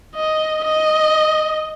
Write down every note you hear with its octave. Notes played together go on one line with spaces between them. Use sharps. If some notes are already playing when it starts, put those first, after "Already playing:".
D#5
D#5